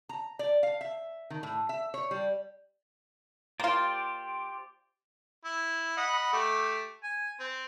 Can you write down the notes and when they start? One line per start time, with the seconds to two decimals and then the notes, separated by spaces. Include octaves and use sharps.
0.09 A#5
0.39 D5
0.63 F5
0.81 E5
1.30 D#3
1.43 A2
1.69 E5
1.94 C#5
2.11 G3
3.60 A#3 F4 G4 C5 D5
5.45 E4
5.97 D#5 F#5 B5
6.33 A3 G4
7.03 G#5
7.40 C4